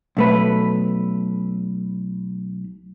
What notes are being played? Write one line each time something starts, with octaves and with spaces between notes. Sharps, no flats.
B1 A3 B4